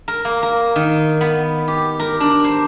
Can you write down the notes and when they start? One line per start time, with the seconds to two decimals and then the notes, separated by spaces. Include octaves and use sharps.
0.08 A#4
0.25 A#3
0.43 A#4
0.76 D#3
1.21 B3
1.68 G4
2.00 A#4
2.20 D4
2.44 C5